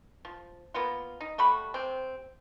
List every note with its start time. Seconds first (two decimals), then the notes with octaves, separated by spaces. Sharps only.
0.25 F3
0.74 A#3 B3 F4
1.21 D#4
1.38 G3 A3 F#4 B5
1.74 C3 C4